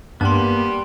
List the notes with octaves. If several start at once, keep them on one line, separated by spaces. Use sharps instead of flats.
G2 G3 A#3 B3 A5 C6